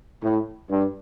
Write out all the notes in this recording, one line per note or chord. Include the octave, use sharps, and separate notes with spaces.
A2
G2